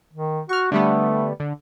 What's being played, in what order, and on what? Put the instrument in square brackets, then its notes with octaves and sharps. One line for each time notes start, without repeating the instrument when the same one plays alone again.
[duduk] D#3
[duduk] F#4 [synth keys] C#6 F6
[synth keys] D3 G3 B3 [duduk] A3
[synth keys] D3